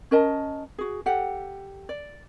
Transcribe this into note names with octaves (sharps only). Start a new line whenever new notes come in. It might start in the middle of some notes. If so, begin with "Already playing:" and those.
C#4 A#4 D#5 A5
F#4 G#4
G4 A4 F#5
D5